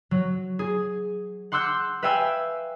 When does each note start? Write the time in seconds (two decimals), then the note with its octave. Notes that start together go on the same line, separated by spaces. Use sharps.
0.11 F#3
0.59 G#4
1.52 F#5 C6 D6 E6 F#6 G6
2.03 B4 E5 F5 G5 G#5 E6